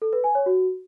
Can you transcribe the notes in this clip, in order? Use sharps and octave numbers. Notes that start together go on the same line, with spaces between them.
A4
B4
G#5
C#5
F#4